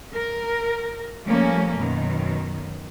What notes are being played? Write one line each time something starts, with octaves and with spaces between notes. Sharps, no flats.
A#4
F3 G3 A3 A#3 C#4
F#2 B2 D#3